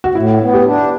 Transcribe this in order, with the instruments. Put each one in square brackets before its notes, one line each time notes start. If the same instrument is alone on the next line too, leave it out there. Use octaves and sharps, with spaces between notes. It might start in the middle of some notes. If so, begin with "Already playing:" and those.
[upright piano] F#4
[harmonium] A2 [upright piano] E4
[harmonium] B3
[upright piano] G4
[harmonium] D4